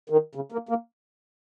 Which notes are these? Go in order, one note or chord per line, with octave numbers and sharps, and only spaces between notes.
D#3
C#3
A#3
A#3